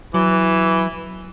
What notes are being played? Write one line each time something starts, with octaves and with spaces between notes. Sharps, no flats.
E3 F#3